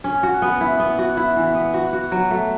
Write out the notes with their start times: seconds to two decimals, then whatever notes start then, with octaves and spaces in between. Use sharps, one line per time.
0.04 C#4
0.23 F#4
0.42 B3
0.61 E4
0.80 B3
0.98 F#4
1.17 E4
1.36 E3
1.55 B3
1.74 F#4
1.93 F#4
2.12 F#3
2.31 A3